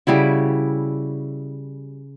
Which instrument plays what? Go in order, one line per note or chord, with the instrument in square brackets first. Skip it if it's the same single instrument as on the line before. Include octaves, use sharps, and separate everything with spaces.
[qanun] C#3 G3 E4 F#4